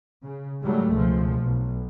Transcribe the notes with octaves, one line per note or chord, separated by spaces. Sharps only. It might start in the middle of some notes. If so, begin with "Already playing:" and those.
C#3
G#2 F#3 G3 A3
C#2 B2 F3
B1